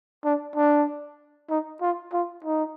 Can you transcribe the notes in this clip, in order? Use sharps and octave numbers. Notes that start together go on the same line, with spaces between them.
D4
D4
D#4
F4
F4
D#4